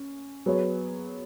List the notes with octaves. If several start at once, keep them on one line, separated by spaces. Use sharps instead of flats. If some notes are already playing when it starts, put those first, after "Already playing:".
Already playing: C#4
F#3 B3 G#4 C#5